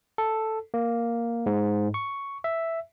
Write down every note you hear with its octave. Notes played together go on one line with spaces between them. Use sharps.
A4
A#3
G#2
C#6
E5